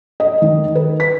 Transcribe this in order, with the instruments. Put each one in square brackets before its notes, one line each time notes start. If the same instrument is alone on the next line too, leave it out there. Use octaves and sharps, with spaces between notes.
[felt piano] D#5
D#3
B4
B6